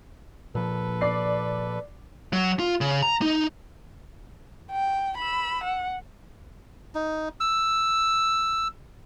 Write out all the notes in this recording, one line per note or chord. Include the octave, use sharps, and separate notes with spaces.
A#2 F3 A4 B4
D5 C7
F#3
F4
C#3
A#5
D#4
G5
B5 E6
F#5
D#4
E6